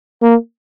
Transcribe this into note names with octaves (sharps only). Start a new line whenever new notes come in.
A#3